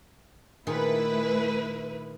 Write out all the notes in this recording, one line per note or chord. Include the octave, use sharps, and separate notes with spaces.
A#2 D#3 A3 E4 G#4 B4